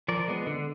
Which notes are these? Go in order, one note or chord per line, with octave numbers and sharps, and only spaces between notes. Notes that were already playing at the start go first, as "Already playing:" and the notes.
F3 A#4 D5
G#3 B3
D3